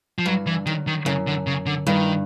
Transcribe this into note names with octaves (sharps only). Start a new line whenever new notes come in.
F3
G2 F#3
E3
F#2 D#3
D#3
F#2 C#3
D3
C#3
D3
G2 D#3